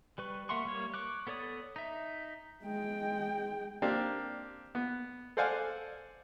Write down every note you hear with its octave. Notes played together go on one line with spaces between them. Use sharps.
G3 B4 C#6
A#3 E5 F#5 C6 C#6
G3 A#3 C#5
C#6 D6 F#6
B3 A4 C#5 D5 D#6
D#4 E5
G#3 G5
A#3 C4 D4 G4
B3
A4 C5 D5 F5 F#5 G#5